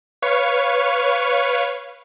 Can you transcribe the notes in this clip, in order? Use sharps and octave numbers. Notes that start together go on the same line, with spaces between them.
B4 C#5 F5 C#6